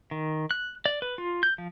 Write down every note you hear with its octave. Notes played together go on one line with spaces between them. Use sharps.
D#3
F#6
D5
B4
F4
G6
F3